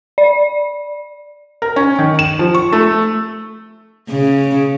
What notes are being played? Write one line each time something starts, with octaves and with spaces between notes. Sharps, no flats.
D5
A#4
C#4
D#3
E7
F3
C#6
A3
C#3